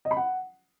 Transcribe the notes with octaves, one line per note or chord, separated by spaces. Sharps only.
D#5
B5
F#5